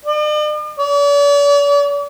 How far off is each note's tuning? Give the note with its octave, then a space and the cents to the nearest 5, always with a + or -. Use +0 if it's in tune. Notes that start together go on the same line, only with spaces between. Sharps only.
D5 +45
D5 -45